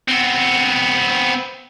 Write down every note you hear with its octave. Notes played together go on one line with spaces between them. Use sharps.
B3 C4